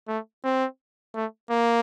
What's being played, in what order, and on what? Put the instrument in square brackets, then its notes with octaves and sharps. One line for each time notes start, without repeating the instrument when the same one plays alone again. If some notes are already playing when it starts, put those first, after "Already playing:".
[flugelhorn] A3
C4
A3
A#3